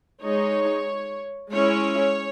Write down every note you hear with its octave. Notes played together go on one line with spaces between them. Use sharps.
G#3 D#4 C#5
G#3 C#4 E4 C#5